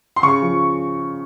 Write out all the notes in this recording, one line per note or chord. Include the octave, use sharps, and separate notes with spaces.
C6
C#3 C#6
F3